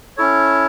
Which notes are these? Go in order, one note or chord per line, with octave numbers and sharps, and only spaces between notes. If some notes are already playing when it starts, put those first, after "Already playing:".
C#4 E4 A4 C#5